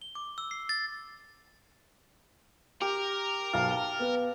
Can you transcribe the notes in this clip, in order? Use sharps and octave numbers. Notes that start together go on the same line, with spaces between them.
G7
D6
E6
C7
A6
G4 A#4
B1 F5 A5 A6
G7
B3 B4